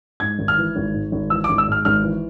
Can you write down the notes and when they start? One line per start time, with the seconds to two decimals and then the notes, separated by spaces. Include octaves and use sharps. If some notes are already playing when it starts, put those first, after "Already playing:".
0.20 G#2 G#6
0.39 G#1
0.48 F6
0.57 E3
0.76 G#1
0.94 G#2
1.12 G#1
1.30 E3 E6
1.44 D6
1.49 G#1
1.58 E6
1.68 G#2 F6
1.85 G#1 F6
2.03 E3